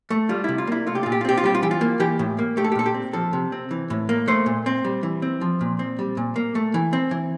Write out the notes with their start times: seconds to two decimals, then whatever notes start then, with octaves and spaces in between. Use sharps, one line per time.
0.10 A3
0.29 G3 F4
0.44 C3 E4
0.58 F4
0.67 A#3 E4
0.87 A3 F4
0.95 G4
1.03 A#2 F4
1.12 G4
1.21 F4
1.25 C4 G4
1.38 F4
1.44 G3 G4
1.55 F4
1.62 E3 G4
1.71 F4
1.81 A#3
2.00 E3 G4
2.19 A2
2.39 A#3
2.57 A3 G4
2.64 A4
2.72 G4
2.75 A#2 A4
2.86 G4
2.94 C4
3.13 F3 A4
3.33 C3
3.52 C4
3.71 E3
3.90 A2
4.09 A#3
4.28 A3 C5
4.46 A#2
4.66 C4
4.85 G3
5.03 E3
5.22 C4
5.41 F3
5.61 A#2
5.79 C4
5.99 G3
6.17 A#2
6.36 A#3
6.55 A3
6.74 E3
6.93 C4
7.11 E3